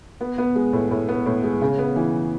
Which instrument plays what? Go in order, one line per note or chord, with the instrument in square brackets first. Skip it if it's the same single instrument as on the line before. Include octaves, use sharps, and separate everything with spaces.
[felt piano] B3
B3
G#3
A2
A2
B3
A2
G#3
C#3
B3
E3